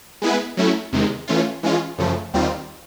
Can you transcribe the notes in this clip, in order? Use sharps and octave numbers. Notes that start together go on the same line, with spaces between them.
G#3 B3 E4 G#4 B4
F#3 A3 C#4 E4
E2 C3 D#3 G#3
E3 A3 C#4 F4
E3 G#3 C#4 F4
F#2 C#3 F3 A3
D#2 D#3 G3 C4 F4